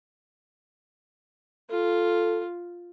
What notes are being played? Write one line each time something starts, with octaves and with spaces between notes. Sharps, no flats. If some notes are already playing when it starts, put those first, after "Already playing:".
F4 A4